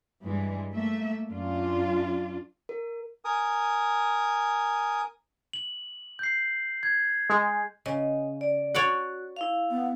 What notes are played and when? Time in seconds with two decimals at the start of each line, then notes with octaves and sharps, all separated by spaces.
0.22 G2 E3 G3 G#3
0.71 A3 A#3 E5
1.29 F#2 D4 F4
2.69 A#4
3.25 A#4 G#5 D#6
5.53 F#7
6.19 G6 C7
6.83 G#6
7.30 G#3
7.86 C#3 D#5
8.41 D5
8.75 F#4 C#5 D5 F#5
9.36 E4 F5
9.71 B3